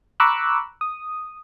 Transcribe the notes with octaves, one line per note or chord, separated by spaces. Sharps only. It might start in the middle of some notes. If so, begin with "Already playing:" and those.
A#5 B5 C#6 D6 E6 F#6
D#6